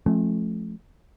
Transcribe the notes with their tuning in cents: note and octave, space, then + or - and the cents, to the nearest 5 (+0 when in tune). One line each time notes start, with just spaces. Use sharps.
F3 +0 A3 -25 C#4 -35